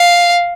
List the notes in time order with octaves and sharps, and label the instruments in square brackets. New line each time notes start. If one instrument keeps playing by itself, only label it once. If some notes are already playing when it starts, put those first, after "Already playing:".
Already playing: [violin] F5